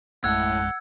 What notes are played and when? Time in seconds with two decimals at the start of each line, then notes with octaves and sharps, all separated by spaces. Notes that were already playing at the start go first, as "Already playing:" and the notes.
0.24 A#1 F#2 A2 G#3 F#5 E6 G#6